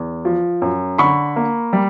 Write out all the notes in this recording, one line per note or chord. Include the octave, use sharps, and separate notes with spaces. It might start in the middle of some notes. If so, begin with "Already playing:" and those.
Already playing: E2
F3
F#2
D3 B5 C#6
A#3
G3